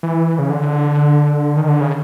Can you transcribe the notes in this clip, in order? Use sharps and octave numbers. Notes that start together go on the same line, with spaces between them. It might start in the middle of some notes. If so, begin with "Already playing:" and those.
E3
C#3
D3
D#3
D3
C#3